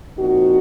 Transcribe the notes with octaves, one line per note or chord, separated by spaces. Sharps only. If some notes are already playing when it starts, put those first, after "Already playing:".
A#2 F3 C4 D#4 F#4